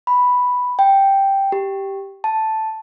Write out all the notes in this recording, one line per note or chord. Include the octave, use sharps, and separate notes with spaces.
B5
G5
G4
A5